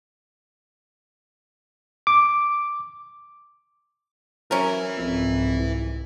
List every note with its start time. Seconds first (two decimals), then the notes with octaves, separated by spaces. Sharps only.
2.07 D6
4.51 F#3 C#4 A#4 B4 E5
4.97 C2 F2 G#2
5.60 E3